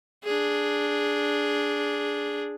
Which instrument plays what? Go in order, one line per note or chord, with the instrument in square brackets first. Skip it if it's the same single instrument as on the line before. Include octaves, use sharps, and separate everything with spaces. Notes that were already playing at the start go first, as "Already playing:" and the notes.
[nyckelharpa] D4 G#4